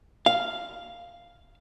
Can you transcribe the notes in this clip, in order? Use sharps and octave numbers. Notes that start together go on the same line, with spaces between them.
F5